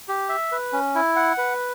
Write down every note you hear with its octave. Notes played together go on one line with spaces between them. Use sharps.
G4
E5
B4
C#4
E4
F#5
B4